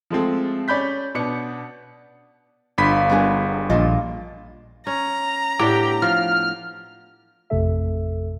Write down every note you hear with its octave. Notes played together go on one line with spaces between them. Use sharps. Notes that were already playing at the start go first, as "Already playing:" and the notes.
F3 G#3 A3 C4
C#4 D5 B5 G6 B6
B2 B3 D4 C#7
G1 D4 F4 B5 C6 B6
G3 B3 D4 G#4 A#4 G#5
A#1 A#2 F3 D4 F4 D#5
C#4 A#5
A2 B3 D4 G4
F3 F6
A1 F2 C3 A3 A4 E5